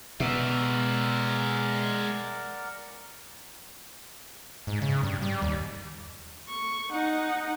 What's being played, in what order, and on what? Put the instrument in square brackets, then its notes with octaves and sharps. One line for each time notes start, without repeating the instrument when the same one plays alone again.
[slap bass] B2 [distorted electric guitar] G#3 E5 [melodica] A#4 D5 F#5
[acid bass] G#2
C#3
G2
G3
D#2
[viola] C#6
D#4 F#5